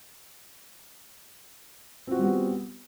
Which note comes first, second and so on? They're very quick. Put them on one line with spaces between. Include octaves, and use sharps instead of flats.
C4 F#4 F4 G3 B3